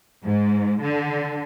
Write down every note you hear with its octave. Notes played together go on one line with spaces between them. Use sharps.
G#2
D3